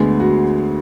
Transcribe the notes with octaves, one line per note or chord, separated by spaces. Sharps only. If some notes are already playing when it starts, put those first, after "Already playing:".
Already playing: D2 D3 G#3 B3 G#4
F#4